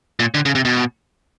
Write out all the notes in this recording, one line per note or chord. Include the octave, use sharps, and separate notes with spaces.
A#2
D3
C#3
C3
B2